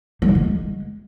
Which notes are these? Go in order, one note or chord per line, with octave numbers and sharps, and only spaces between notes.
G3
D3
G#3